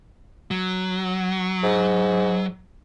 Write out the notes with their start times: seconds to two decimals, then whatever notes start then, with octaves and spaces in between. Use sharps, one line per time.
0.51 F#3
1.63 G#2